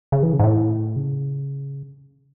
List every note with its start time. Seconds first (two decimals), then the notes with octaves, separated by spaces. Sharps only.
0.12 C#3
0.23 E3
0.33 C#3
0.39 G#2
0.44 A2
0.96 C#3